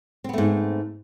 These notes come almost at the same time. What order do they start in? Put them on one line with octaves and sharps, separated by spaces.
C4 B3 A3 G#2